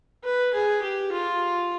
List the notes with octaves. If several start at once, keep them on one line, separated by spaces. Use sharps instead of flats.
B4
G#4
G4
F4